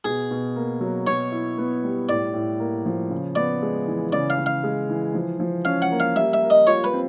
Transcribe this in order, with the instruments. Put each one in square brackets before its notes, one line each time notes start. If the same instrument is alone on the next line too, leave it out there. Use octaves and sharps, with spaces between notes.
[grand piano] B2 [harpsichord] G#4
[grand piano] B2
A#3
F#3
[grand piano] B2 [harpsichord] C#5
[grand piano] E4
B3
G3
[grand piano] A2 [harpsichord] D5
[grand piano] A2
A#3
F3
C#3
[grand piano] B3 [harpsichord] D5
[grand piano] G#3
E3
[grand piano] C#3 [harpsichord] D5
[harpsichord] F5
[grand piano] C#3
[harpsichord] F5
[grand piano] G#3
E3
F3
F3
[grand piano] C#4 [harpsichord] F5
[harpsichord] F#5
[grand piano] A#3
[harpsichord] F5
[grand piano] G3 [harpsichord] E5
[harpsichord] E5
[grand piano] A#4
[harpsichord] D#5
[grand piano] F4 [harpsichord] C#5
[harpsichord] B4
[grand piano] C4